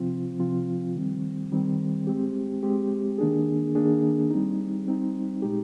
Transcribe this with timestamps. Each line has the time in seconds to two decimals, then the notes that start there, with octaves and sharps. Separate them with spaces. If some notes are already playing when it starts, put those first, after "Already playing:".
Already playing: C3 F3 C4 F4
0.39 C3 F3 C4 F4
0.95 D#3 G3 C4
1.52 D#3 G3 C4
2.07 G#3 C4 G4
2.63 G#3 C4 G4
3.18 D#3 A#3 D4 G#4
3.75 D#3 A#3 D4 G#4
4.30 G3 C4 D#4
4.86 G3 C4 D#4
5.42 A#2 G#3 D#4 G4